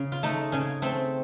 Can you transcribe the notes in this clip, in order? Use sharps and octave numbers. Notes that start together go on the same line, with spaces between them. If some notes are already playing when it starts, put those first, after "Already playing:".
Already playing: C#3 C#4
F4
A3 D#4
C#3 C#4
A3 C4